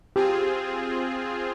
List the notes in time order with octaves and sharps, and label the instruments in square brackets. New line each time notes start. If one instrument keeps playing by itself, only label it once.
[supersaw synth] C4 F4 G#4 [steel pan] G4